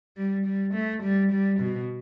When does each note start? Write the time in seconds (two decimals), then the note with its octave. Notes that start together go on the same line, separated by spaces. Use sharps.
0.17 G3
0.46 G3
0.74 A3
1.03 G3
1.32 G3
1.60 B2